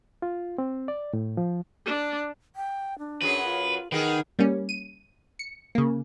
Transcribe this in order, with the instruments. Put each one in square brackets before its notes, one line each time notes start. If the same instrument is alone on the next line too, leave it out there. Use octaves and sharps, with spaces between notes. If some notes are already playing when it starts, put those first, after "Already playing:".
[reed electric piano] F4
C4
D5
A2
F3
[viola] D4
[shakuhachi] G5
D4
[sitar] F#2 F#3 G#4 [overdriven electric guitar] B4
[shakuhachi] F4
[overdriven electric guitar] D#3 [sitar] B3 G#4 [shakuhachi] A#4
[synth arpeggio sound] G3 A#3 C#4
D#7
C#7
C#3 A#3